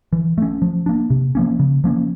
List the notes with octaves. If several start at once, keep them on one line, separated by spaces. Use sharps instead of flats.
E3
A3 C#4
F3
A#3 D4
C3
F3 A#3 C#4
C#3
F3 A#3 C#4